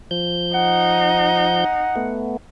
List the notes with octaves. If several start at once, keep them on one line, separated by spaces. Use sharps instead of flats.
F3 G6
D#4 F#5
A3 B3